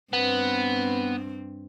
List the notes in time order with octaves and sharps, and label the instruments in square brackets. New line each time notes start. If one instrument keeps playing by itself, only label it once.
[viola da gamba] G2 C4 [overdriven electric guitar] B3